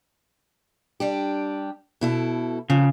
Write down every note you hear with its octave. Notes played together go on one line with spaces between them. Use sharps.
G3 D4 G4
B2 E4 A4
F2 C#3 F3